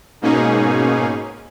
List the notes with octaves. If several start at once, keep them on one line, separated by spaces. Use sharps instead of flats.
G#2 B2 A#3 C#4 D#4 G#4